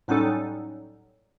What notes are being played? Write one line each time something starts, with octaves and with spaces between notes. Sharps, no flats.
A2 F#3 G3 C#4 D#4 A4